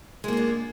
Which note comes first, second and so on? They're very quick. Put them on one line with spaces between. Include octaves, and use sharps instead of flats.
G#3 A#3 F4 D4